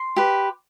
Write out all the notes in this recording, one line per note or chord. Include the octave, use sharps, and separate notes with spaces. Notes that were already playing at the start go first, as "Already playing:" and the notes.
Already playing: C6
G4 B4